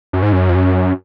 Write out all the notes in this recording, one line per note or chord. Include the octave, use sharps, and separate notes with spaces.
F#2
G#2
F#2
F2
F#2